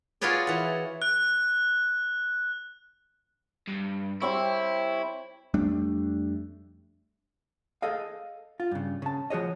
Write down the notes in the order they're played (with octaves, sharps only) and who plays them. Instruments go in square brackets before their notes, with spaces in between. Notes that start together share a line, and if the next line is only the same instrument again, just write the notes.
[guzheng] F4 F#4 G#4 B4 C#5 D5
E3 F#5
[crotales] F#6
[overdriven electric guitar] G2
[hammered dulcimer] G3 C4 C#5 [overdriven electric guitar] E4
[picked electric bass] F2 G3 A3 D4
[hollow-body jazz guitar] G#4 A4 D#5 F5
F4
G2 C#3
C#3 A5
F3 F#4 G#4 C#5 D#5